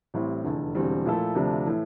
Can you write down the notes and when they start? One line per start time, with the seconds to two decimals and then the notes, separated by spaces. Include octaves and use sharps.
0.14 A1 A2 G3 C4
0.44 F1 E2 D3
0.75 E1 E2 D3 G3 C4
1.05 A#2 F3 A3 E4 A4
1.35 D2 C3 F3 A3 D4
1.66 A2 E3 A3